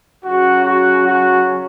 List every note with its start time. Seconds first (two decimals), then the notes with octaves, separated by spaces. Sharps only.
0.24 C#3 F#3 C#4 F#4
0.65 F#4
1.06 F#4